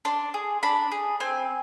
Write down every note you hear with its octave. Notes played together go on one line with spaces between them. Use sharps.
D4 C6
G#4
D4 B5
G#4
C4 G#5